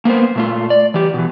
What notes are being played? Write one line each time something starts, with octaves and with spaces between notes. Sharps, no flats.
A#3 B3 A#4 C5
A#2 A3 F4
D5
E3 G4
B2 E3